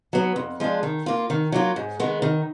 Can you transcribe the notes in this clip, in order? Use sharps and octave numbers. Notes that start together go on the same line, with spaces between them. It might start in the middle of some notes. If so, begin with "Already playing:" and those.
F#3 B3
F2
F3 G#3 D4
D#3
A#3 F4
D#3
F#3 A#3 F4
G#2
D#3 G#3 B3
D#3